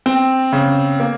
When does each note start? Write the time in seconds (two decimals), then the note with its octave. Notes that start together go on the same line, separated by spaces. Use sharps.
0.06 C4
0.52 C#3
1.00 A#3